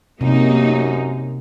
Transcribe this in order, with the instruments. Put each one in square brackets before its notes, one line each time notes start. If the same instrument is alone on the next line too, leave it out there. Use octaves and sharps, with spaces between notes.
[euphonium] F#2 [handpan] C3 [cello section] A#3 D#4